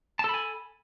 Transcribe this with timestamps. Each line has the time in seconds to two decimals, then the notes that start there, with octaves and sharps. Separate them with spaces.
0.19 A5
0.24 A4
0.29 B5
0.34 G#5